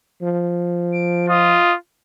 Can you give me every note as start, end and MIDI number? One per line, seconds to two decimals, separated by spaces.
0.22 1.57 53
0.93 1.29 98
1.29 1.76 65
1.29 1.74 75